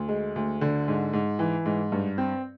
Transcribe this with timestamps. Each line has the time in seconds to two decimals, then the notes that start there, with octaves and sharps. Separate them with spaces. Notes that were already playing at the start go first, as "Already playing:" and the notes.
Already playing: D2
0.09 G#3
0.36 D2
0.61 D3
0.88 G#2
1.13 G#2
1.39 E3
1.66 G#2
1.92 G2
2.18 C4